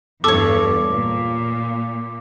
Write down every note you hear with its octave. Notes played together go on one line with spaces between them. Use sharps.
E2 G2 A4 C#5 D6
A#2